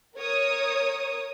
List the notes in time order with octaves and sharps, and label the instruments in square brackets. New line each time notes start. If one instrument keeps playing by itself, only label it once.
[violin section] A#4 C#5 D#6